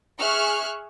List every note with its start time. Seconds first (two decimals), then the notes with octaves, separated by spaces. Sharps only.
0.19 G#4 E5 C#6 F6 F#6